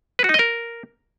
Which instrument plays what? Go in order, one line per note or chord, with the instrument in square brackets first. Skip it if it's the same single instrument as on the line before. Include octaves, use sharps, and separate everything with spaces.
[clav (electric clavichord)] B4
F#4
D#4
D#5
A#4